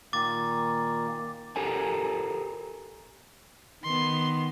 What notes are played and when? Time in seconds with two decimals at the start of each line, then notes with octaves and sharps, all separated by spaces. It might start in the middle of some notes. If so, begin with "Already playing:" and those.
0.13 A#2 D#3 A#3 D6 A6
1.56 G4 A4 A#4 G#5
3.84 D#3 B3 C6